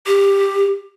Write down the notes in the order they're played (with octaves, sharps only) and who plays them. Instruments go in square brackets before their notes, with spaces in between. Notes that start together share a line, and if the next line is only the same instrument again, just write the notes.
[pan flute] G4